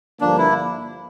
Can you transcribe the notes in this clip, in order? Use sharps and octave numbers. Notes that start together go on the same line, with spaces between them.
G2 D3 F3 A#3 D4
E4